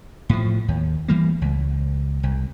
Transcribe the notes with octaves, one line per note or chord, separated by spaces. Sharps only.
A2 F3
D#2
E3 G3 A#3
C#2
C2